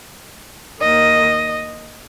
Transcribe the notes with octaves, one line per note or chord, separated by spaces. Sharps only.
D#2 D#3 D#5